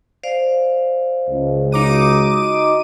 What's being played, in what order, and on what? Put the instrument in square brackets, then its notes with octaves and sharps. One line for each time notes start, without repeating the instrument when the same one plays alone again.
[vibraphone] C5 D5 F5
[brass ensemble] C#2
[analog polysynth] D#4 D6 D#7 [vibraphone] F#4 A#5